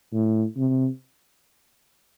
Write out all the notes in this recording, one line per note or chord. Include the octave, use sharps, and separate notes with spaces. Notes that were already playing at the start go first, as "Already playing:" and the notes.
A2
C3